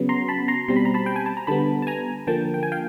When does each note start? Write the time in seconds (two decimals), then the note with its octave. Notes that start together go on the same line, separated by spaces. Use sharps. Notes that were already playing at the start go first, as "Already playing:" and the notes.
Already playing: C#3 F#3 B3
0.09 A#5 C6
0.28 A5 B5
0.48 A#5 C6
0.68 B2 G3 C4 C6
0.76 B5
0.85 A#5
0.94 A5 B5
1.06 G5
1.16 G#5
1.26 A5
1.37 A#5
1.47 D3 G3 B3 A5 B5
1.82 A5
1.87 G#5 A#5
2.27 D3 F3 A#3 G5 A5
2.54 G5
2.63 G#5
2.72 F5 G5